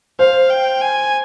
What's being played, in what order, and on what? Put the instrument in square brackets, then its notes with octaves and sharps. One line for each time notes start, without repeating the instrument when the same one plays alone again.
[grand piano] C5 [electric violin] F5
[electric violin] G5
G#5